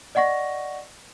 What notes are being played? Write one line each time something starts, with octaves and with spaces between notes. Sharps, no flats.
D5 D#5 F#5 C#6 A#6